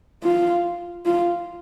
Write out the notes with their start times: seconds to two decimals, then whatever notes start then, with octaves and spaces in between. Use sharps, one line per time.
0.23 F4
1.06 F4